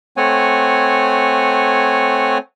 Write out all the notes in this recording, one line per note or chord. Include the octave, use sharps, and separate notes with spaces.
A3 C4 C#5 F#5 G#5